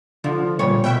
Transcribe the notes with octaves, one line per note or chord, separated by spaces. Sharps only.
D3 F3
A#2 G3 C#5
B2 E5 G5